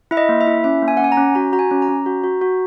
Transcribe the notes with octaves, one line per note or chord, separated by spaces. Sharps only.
E4 E5
D#5
A#3
E5
E4
C#4 E5
A#3
G#5
F#5
C#4 G#5
A#5
C#4
F#4 A#5
F#4 A#5
G#5
C#4
A#5
C#4
F#4
F#4
F#4